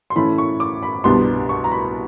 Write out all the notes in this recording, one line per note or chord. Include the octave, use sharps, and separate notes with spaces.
C6
A2 E3 A3 C#4 B5
C#6
D6
B5
C2 B2 G3 B3 D4 C6
C#6
A#5
B5